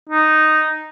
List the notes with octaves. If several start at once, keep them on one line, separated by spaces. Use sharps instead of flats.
D#4